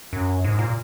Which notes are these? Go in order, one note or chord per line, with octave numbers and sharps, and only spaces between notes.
F#2
G#2
A#2